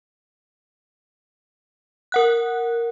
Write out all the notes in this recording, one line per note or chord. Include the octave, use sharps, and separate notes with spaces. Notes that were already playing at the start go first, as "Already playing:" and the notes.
A#4 F#5 F#6